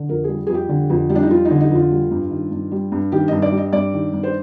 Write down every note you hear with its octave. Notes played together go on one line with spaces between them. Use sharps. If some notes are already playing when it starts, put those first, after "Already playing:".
Already playing: D3
F2 A#4
G3 G#4
F2 G#4
G4
D3
F2
G3
D4
D#4
F2 F4
D#4
D3
D#4
F2
F4
G3
G2
D#3
G2
G3
G2
D#3 G4
G2 D#5
D5
G3
D#5
G2 D5
D#3
G2
C5